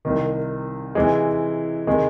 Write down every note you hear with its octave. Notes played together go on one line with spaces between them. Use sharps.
C2 C3 D#3
C3 E3 G#3
C3 D#3 G#3